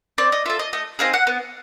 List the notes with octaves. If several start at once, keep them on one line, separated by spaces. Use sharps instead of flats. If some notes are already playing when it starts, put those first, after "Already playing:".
C4 D5
D#5
F4 A4 E5
D#5
A3 D#5
C4 D#4 G#4 F5
F#5
B3